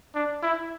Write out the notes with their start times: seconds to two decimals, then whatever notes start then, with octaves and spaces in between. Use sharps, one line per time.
0.15 D4
0.43 E4